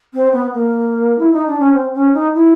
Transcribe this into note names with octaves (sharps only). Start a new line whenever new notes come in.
C4
B3
A#3
E4
D#4
D4
C#4
C4
C#4
D#4
E4